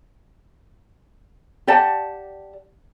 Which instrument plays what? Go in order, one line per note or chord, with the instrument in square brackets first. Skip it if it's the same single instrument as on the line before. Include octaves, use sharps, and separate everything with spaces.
[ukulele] G4 D5 F#5 A5